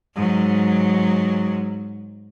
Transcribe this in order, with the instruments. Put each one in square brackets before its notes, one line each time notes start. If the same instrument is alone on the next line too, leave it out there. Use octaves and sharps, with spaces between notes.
[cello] G#2 F#3